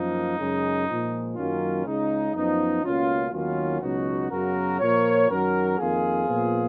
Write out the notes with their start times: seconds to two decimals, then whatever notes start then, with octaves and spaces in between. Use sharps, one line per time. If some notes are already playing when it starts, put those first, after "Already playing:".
Already playing: F#2 F3 A#3 D#4
0.37 F#2 C#3 G#3
0.87 A#2 F3 G#3
1.35 F#2 D#3 F#3 A#3 C#4 F4
1.85 C#2 C#3 G#3 D#4
2.34 F#2 F3 B3 D#4
2.83 C#2 B2 A#3 C#4 F4
3.32 D#2 D#3 F#3 B3 C#4 F4
3.81 C#2 B2 F#3 B3 D#4 F#4
4.30 F#2 C#3 F#3 B3 F#4 A#4
4.80 A#2 F3 A#3 A#4 C#5
5.29 F#2 D#3 F#3 F#4 A#4
5.78 F2 D#3 A#3 F4 G#4
6.27 A#2 F3 B3